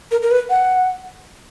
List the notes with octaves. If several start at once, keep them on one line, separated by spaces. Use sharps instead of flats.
A#4
A#4
B4
F#5